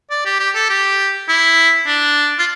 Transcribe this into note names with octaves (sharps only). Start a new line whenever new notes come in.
D5
G4
G4
A4
G4
E4
D4
F4